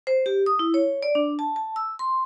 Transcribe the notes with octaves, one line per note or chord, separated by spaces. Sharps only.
C5
G4
D#6
E4
C#5
D5
D4
A5
A5
E6
C6